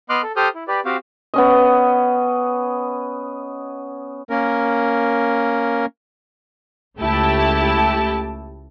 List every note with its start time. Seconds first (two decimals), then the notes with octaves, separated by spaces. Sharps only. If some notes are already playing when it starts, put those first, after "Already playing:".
0.10 B3 D#5 C6 D6 F6 F#6
0.23 A4
0.36 G4 A4 C5 D#6 F6 G6
0.55 E4
0.68 G4 B4 D5
0.85 C4 F#4 G4 C5 F5
1.34 B3 C#4 D#5
4.30 A#3 C#4 A#4
6.98 C#2 A3 E4 G4 G5 A5